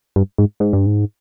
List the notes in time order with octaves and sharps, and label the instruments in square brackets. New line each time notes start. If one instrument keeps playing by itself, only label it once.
[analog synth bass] G2
G#2
G#2
G2
G#2